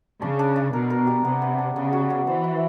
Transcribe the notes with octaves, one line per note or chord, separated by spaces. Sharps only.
C#3 D4
D4
D4
B2 A#4
A#4
G4
C3 B3
B3
D4
C#3 B3
F#4
B3
E3 C5
E4